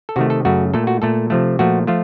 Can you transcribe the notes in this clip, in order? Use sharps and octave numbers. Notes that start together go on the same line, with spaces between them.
A4
C3 D#3 A3 F#4
A4
F#2 C#3 A3 F#4
A#2 A3 A4
F#4
A#2 A3 A4
C3 F3 A3
A#2 F3 A3 F#4
F3 A3 F4